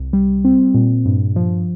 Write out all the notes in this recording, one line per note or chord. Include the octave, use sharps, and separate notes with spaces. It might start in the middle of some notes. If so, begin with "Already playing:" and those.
Already playing: C2
G3
C4
A#2
G2
F3